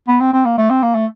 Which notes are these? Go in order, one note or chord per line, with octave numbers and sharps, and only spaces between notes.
B3
C4
C4
A#3
A3
C4
A#3
A3